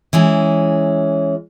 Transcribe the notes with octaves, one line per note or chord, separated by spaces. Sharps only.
E3 G#3 C#4